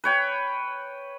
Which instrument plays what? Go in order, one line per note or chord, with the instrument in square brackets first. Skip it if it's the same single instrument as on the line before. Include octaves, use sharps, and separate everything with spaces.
[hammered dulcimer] B4 C#5 G5